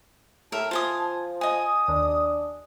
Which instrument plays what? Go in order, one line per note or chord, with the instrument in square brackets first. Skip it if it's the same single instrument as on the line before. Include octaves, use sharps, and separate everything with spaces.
[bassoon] A2 [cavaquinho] A#4 E5 [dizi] A5
[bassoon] F3 [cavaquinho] F4 G#5 D#6
[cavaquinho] D#5 G#5 [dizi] D#6
[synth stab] D#2 [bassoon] D4